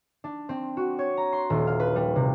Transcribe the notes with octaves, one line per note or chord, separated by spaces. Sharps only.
D4
C4
F#4
C#5
A#5
C6
D#1
F5
B4
G3
C3